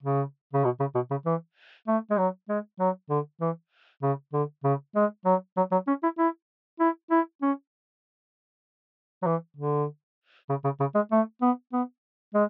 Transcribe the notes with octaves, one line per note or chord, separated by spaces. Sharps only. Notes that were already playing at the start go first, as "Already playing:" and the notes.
C#3
C#3
B2
C#3
B2
C#3
E3
A3
G#3
F#3
G#3
F#3
D3
E3
C#3
D3
C#3
G#3
F#3
F#3
F#3
C#4
E4
E4
E4
E4
C#4
F#3
E3
D3
C#3
C#3
C#3
G#3
A3
B3
B3
G#3